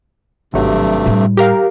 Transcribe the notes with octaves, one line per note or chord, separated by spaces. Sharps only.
G#1 G2 C3 F#3 A3
A2 G3
G4 A#4 F5